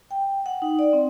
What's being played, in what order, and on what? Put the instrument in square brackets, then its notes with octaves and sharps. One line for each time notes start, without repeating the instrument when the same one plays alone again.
[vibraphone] G5
F#5
D#4
D5
C4